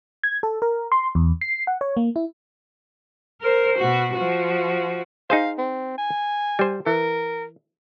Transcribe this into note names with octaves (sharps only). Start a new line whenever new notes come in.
G#6
A4
A#4
C6
E2
C7
F#5
C#5
A#3
E4
A#4 C5
B2 F#4
F3 F#4
D#4 G#4 C5 F5
C4
G#5
G3 C5
E3 A#4